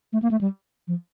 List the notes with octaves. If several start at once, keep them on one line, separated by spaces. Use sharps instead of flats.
A3
A#3
A3
G3
F3